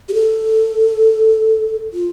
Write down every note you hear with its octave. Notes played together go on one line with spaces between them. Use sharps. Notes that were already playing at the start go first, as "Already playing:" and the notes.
G4
A4
F4